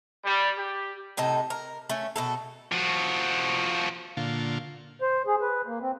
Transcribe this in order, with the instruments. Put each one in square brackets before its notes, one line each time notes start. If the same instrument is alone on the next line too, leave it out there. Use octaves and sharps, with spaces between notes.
[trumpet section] G3
G4
[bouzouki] A2 C3 D#4 A4
A#4
A3 C#4
B2 F#4 A4
[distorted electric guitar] F3 F#4
[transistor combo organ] A#2 D3 F4
[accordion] C5
G#4
B4
A#3
C4